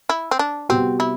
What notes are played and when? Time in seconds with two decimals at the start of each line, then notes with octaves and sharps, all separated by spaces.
0.09 E4
0.31 C4
0.39 D4
0.69 C3 G3 B3 C4 F#4
1.00 E4